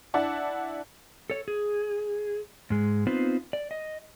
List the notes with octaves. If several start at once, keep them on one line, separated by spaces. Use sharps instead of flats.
D4 E4 D5 F#5 A5
A4 C#5
G#4
G#2 G#3
B3 C4 D#4 F4 B4 C5
D5
D#5